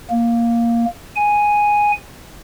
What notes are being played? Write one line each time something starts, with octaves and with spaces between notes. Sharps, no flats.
A#3
G#5